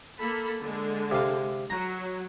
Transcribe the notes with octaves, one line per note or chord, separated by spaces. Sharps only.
A#3 A4 B5
D3 G#3
C3 F5
F#3 A#5